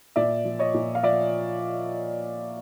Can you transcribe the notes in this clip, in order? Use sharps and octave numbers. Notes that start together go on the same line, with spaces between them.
A#2 D5 E5
F3
C#5 D#5
A#2
F5
F3 D5 E5